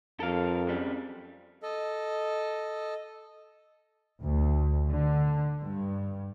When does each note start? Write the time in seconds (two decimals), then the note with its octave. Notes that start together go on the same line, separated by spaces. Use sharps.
0.20 F2 A4 A#4 F5
0.67 F#2 G3 G#3
1.63 A4 D#5
4.23 D2
4.90 D3
5.62 G2